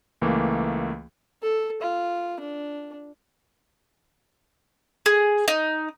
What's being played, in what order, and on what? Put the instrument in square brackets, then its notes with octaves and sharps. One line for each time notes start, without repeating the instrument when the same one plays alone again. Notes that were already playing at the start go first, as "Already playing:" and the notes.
[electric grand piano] C#2 E3 A3 A#3
[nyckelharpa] A4
F4
D4
[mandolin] G#4
D#4